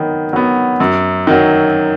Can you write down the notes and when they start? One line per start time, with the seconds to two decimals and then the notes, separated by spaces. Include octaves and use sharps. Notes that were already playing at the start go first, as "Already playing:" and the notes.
Already playing: D#3 F#3 B3
0.33 F#3 B3
0.80 F#2
1.27 D#3 F#3